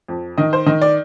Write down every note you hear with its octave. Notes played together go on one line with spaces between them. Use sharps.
F2
D#3 D#5
C5
D#3 D#5
D5